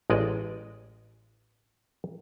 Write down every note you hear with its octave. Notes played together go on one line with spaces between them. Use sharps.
A1 G#3 D5 D#5